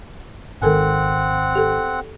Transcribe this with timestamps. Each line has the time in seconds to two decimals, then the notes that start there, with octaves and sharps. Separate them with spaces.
0.62 G#1 D#3 C4 A4 A#4 F#5 G#5
1.55 G4 A4